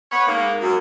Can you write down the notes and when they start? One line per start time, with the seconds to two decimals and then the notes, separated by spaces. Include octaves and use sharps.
0.12 B3 B4 C#5
0.28 G#2 A#3
0.62 F#2